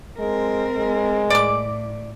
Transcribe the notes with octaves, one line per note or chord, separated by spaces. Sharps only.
G#3 C4 A#4
G#3
A2 D5 D6